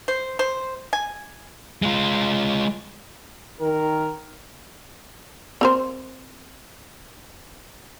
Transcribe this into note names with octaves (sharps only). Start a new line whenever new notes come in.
C5
C5
G#5
G#3 F4
D#3 A#4
C4 A#4 C5